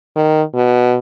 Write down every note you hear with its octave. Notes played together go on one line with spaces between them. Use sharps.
D#3
B2